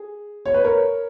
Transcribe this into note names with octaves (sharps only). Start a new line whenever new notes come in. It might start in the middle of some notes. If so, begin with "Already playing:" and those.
Already playing: G#4
C#5
B4
A#4 C#5